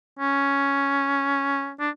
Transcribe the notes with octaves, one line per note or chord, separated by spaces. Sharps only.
C#4
D4